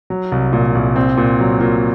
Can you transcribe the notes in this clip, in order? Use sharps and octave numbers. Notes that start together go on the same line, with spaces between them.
F#3
C2
A#2
C2
C4
A#2
F#3
A#2